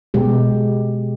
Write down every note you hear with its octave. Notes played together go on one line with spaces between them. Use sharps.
B2 G#3 G4